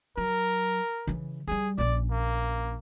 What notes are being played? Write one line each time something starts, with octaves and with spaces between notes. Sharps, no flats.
F#3 A#4
C#3 E3
F#3 G3 G#4
A#1 C#4 D5
A#3